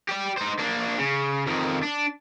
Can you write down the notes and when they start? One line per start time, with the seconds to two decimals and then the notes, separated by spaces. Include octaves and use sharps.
0.09 G4 D5
0.37 D#4 C5
0.59 A#3 D4
0.99 C#3
1.46 F2 D#3
1.83 D4